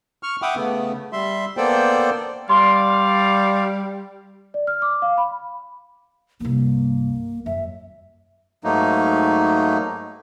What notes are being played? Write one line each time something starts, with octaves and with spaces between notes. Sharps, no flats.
C#6 F6
E5 F#5 G5 B5 D6 D#6
C#3 A3 B3
G3 E5 C6
A#3 B3 A4 C5 D5 G5
G3 D5 F5 C6
D5
F6
D6
F5
B5
C2 G2 A#3
F#2 E5
G#2 F#3 A3 A#3 D#4